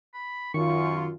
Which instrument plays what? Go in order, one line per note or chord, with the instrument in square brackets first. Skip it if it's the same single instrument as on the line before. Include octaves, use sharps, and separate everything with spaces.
[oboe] B5
[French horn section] F#2 F4 [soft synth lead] D#3 [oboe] C#6